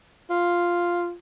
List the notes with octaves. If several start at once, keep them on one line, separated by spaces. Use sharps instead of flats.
F4